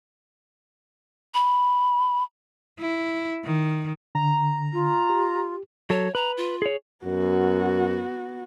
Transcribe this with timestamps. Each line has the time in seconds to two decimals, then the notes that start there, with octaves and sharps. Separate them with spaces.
1.34 B5
2.79 E4
3.45 D#3
4.15 D3 A#5
4.73 F4
5.10 G4
5.90 F#3 A4 C#5
6.15 B4 A#5
6.37 F4
6.62 G#4 C#5
7.05 F#2 B3 F#4